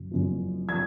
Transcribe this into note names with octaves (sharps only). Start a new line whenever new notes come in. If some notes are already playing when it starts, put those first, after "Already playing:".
Already playing: F#1 F#2
F#1 F#2 F3
F3 G#6